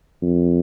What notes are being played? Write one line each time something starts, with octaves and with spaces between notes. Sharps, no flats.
F2